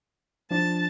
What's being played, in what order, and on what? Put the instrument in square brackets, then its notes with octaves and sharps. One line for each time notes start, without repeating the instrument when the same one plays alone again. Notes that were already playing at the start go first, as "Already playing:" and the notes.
[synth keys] F3 D4 [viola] A5